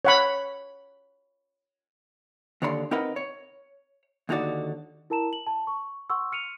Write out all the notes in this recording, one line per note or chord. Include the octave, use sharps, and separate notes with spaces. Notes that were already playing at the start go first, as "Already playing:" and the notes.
C#5 F#5 B5
D#2 D3 C#5 D5 B5 C6
C4 D#4 A#4 B4 D#5 F#5
C#5
D#2 D3 D#4 F#4 D5
E4 A#4 A5 A#5 E7
F#7
A5
C#6
F#5 C6 C#6 E6
F6 C#7 D#7 F7